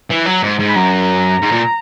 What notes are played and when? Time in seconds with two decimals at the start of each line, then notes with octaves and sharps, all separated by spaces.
0.10 E3
0.26 F#3
0.42 G#2
0.60 G#2
0.69 B5
0.76 F#2 A#5
1.42 G#2
1.51 A#2